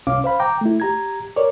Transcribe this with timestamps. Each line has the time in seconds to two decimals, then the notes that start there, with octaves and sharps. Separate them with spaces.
0.07 C2 C#4 F5 D6
0.24 C5 F5 B5
0.40 G5 A#5 D6
0.61 A3 E4
0.80 G4 A#5 G#6
1.36 A#4 C#5 D5